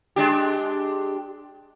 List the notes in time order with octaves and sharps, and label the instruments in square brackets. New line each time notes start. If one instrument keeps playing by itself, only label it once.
[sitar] G#3 D4 G4